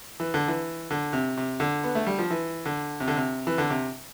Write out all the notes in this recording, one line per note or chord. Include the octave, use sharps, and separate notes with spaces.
E3
D3
E3
D3
C3
C3
D3
B3
A3
G3
F3
E3
D3
C3
D3
C3
E3
D3
C3